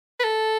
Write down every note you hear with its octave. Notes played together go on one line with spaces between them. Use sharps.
B4
A4